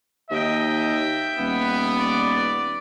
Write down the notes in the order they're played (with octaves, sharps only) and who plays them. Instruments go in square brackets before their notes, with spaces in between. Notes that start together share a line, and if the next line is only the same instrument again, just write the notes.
[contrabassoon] D#2 [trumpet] D#5 [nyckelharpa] E5 G5
[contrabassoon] D#1 [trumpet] B3
[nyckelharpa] D5